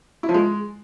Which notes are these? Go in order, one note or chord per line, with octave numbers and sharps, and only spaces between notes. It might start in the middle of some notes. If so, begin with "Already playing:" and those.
E4
F3
G#3